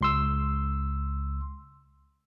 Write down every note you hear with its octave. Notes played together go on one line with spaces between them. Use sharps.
C#2 C6 E6